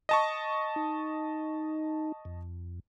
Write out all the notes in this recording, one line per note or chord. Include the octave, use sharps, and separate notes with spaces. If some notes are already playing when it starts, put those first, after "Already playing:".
D#5 A5 C#6
D#4
F2